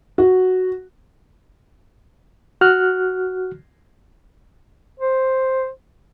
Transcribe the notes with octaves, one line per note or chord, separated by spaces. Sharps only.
F#4
F#4 F6 F#6
C5